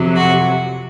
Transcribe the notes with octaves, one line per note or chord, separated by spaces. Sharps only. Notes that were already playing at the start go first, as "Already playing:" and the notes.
Already playing: F2 C3 F#3
F#4